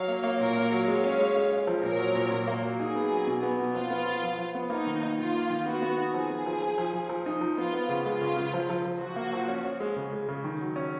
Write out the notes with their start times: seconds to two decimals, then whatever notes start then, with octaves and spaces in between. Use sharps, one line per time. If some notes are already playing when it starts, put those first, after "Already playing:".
Already playing: F#3 C#5 F5
0.08 A#3
0.23 A#3
0.40 A#2 A#4 C#5
0.56 A#3
0.72 F#3
0.87 G#3 C#5 F5
1.04 C#4
1.20 G#3
1.36 G#3
1.52 G#3
1.67 F3
1.83 A#2 A#4 C#5
1.99 F#3
2.15 A#2
2.31 A#2
2.47 A#3
2.63 F#3
2.79 D#4 G#4
2.95 B3
3.11 F#3
3.27 B2
3.43 B3
3.59 B2
3.75 F3 F4
3.90 B3
4.06 F3
4.23 F3
4.38 F3
4.55 B3
4.70 A#3 D#4
4.87 D#3
5.03 A#3
5.18 D#3 F4
5.34 A#3
5.50 D#3
5.66 B3 F#4
5.82 B3
5.98 D#4
6.14 F3 G#4
6.30 B3
6.46 F3
6.62 F3
6.78 F3
6.94 F3
7.09 F3
7.26 D#4
7.41 F3
7.58 B3 F4
7.74 B3
7.89 C#3
8.05 G#3 F4
8.21 C#3
8.36 C#3
8.54 F3
8.70 F3
8.85 F3
9.00 F3 F#4
9.16 A#3
9.33 F3
9.48 C#4
9.64 C#4
9.80 G#3
9.96 C#3
10.13 G#3
10.28 C#3
10.44 D#3
10.61 F#3
10.76 C#4